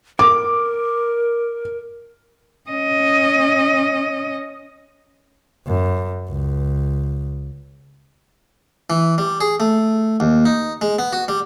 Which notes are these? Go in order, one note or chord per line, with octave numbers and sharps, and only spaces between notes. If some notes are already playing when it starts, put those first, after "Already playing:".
A#4 D6
C#4 D#5
F#2
C#2
E3
G3
G#4
A3
D#2
D#4
G#3
B3
F#4
G3